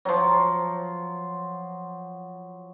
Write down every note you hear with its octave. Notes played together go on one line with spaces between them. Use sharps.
F3 F#3